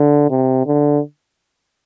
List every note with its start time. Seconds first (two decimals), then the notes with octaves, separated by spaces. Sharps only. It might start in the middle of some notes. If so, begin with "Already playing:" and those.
Already playing: D3
0.30 C3
0.67 D3